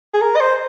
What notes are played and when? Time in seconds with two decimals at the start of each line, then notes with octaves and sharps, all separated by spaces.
0.14 G#4
0.21 A#4
0.36 D#5
0.41 C5